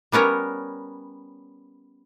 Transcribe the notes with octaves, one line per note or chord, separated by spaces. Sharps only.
G3 B3 C#4 A#4 C#5